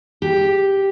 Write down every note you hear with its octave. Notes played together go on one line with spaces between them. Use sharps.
G4